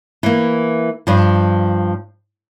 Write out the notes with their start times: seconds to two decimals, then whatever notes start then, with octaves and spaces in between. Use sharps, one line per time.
0.23 E3 A#3
1.07 G2 F3